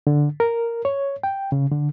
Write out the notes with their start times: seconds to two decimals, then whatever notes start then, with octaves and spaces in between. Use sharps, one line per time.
0.07 D3
0.40 A#4
0.85 C#5
1.24 G5
1.52 C#3
1.71 D3